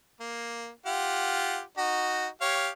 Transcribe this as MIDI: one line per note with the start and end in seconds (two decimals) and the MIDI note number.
0.20 0.69 58
0.86 1.61 65
0.86 1.61 67
0.86 1.61 78
1.78 2.28 63
1.78 2.28 66
2.41 2.69 67
2.41 2.69 73
2.41 2.69 77